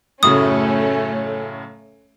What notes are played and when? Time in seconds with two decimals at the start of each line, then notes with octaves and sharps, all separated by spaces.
0.23 F#2 A2 C#3 A3 C#4 D#6